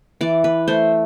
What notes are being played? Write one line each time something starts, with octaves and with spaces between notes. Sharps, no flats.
E3 D5
B4
A3 C5